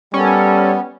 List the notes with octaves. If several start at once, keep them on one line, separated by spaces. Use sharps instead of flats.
G3 B3 C#4 A4 A#4 D5